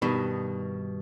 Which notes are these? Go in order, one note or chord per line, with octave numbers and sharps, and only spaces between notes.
G2 B2 D#3